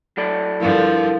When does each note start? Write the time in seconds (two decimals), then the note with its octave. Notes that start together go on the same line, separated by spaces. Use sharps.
0.17 F#3 A4 D5
0.60 G2 D3 F3 E4 A#4 F5